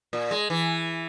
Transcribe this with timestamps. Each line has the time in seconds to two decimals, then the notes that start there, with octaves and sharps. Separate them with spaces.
0.13 A#2
0.31 G#3
0.50 E3